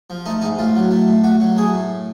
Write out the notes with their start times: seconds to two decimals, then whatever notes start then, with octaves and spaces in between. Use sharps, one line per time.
0.10 F3
0.26 A3 D#4
0.41 G#2 D#4
0.59 A2 F4
0.76 F#3
0.91 A3
1.08 A2
1.24 A2 F#4
1.40 F#3
1.57 A3 G#4
1.74 A2